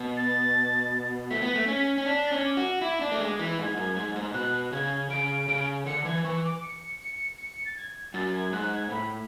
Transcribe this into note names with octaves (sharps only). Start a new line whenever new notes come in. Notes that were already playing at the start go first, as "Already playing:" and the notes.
Already playing: B2
A6
A3 B6
B3
A3
C#4
C#4
D4 B6
A6
C#4
D6
F#4
E4 D6
D4 D6
A3
G#3 D6
E3 B6
G#2 G#6
F#2
G#2
G#2
B2 F#6
C#3 G#6
C#3 D7
C#3
D3 C#7
E3 G#6
E3 C#6
D6
C#7
C#7
C#7
A6
G#6
F#2 A6
G#6
G#2 F#6
G#6
A2 B5